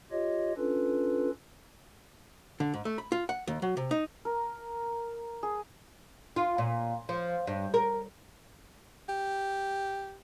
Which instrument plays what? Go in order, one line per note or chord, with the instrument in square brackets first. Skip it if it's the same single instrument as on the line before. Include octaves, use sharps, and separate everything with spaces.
[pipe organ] F4 G4 C#5 D#5
C#4 D4 F4 A4 B4
[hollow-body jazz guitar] D3
G#2
A3
B5
F4
F#5
D#2
F#3
C3
D#4
[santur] A#4
G#4
[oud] F4
A#2
F3
G2
A#4
[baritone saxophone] G4